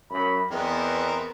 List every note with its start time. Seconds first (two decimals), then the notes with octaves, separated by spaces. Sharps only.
0.10 F#2 B5
0.51 E2 B3 C4 A#4 D#5